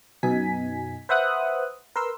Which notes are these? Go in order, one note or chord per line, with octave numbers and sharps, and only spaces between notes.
F#2 B2 D#4 G#5 B6
B4 C5 E5 F#5 D#6 F#6
A#4 B4 C6 E6